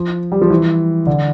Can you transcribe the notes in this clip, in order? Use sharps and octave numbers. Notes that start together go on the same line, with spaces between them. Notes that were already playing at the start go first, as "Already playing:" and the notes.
Already playing: F3
G3
F3
E3
D3